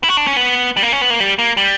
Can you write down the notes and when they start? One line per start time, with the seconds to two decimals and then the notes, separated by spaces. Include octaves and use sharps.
0.04 E4
0.09 F#4
0.17 D4
0.27 C#4
0.36 B3
0.77 G3
0.83 A#3
0.92 C#4
1.01 B3
1.10 A#3
1.20 G3
1.39 A#3
1.57 G3